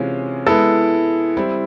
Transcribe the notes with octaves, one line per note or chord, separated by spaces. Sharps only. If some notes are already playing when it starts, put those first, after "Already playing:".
Already playing: C3 E3 G#3 C#4 F4
G#3 B3 E4 A4
G3 C4 E4